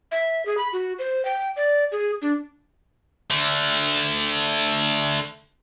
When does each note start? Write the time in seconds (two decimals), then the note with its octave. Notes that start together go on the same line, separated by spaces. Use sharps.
0.12 E5
0.46 G#4
0.57 B5
0.73 F#4
0.99 C5
1.25 G5
1.56 D5
1.92 G#4
2.22 D4
3.30 D3 A3